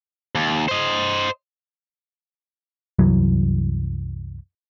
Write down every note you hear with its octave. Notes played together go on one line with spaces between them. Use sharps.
D#2
C5 D#5
C2 F#2 E3 F#3